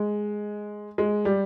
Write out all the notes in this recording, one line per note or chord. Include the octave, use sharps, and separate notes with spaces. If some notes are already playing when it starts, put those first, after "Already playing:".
Already playing: G#3
G#3
G3